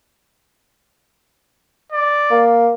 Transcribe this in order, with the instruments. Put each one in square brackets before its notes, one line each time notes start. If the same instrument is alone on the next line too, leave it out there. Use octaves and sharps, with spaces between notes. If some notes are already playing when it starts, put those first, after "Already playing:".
[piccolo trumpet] D5
[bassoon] A#3